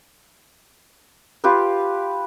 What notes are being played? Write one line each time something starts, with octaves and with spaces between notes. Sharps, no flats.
F4 G4 B4